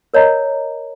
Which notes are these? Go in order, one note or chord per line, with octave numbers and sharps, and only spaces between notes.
A#4 C#5 D#5 A#5